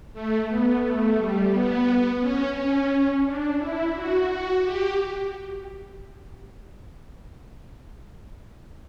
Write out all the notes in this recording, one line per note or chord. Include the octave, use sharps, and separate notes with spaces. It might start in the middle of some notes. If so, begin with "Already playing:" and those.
A3
B3
A3
G3
B3
C#4
C#4
D4
E4
F#4
F#4
G4